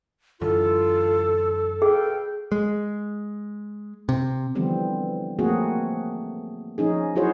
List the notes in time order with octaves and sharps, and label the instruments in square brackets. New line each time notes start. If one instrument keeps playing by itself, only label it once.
[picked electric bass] F#2 D3 E3 [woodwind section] F4 [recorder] A4
[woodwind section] B2 F5 G5 [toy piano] G#4
[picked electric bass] G#3
C3
[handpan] D3 E3 F3 G3 B3 C4
F3 A3 A#3 C4 F#4 G#4
F3 C#4 D#4 G#4
F#3 E4 F#4 G#4 C5 C#5